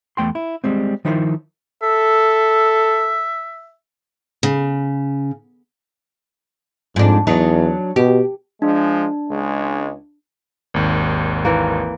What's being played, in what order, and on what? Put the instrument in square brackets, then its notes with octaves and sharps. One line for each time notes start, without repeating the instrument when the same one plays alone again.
[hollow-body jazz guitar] E2 A3 G5 C6
E4
G3 G#3 C4
D#3 F3 D#4 E4 A#4 C5
[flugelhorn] A4 [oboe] E5
[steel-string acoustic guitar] C#3
[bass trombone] F2 [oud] G#2 D4
[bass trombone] E2 [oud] F#3 D4 D#4
[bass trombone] B2 [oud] G4
[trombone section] F3 G#3 [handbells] D4
[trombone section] C#2 G#3
[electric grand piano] G#1 D#2
[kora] E3 A#3